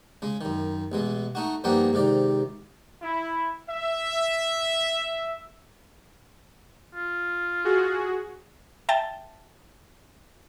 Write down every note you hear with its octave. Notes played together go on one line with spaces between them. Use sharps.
C#3 G#3
F#2 D#3
A1 B2 G#3
A3 D#4 F#4
G2 F3 A#3 D#4 F#5 G5
G#2 C3 D#3 D5
E4
E5
F4
F#4 G#4
E5 G5 A5 A6